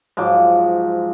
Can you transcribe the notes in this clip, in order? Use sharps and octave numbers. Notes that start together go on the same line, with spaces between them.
G#2 F3 F#3 D6